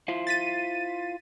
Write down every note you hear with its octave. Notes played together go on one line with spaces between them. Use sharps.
E4 F4 C5
A6 B6 D#7